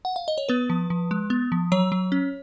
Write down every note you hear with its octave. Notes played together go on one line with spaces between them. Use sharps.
F#5
F5
D#5
C#5
B3 B4
F3
F3
G#3
B3
F3
F#3 C#5
F#3
C#4